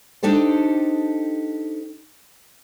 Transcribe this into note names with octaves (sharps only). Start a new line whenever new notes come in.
D4 D#4 G4 A4 C5